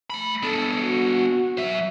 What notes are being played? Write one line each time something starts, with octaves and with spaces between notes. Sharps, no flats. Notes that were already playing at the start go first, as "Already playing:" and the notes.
A3 B5
B3 D4 A4
F#4
F#3 E5